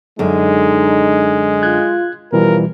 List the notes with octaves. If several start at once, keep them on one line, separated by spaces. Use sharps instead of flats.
F#2 D3 G#3 D#4
F4 F#6 G#6
B2 E3 F3 G3 A#4